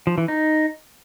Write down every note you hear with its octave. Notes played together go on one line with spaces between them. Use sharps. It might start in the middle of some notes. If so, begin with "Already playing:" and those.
F3
E3
D#4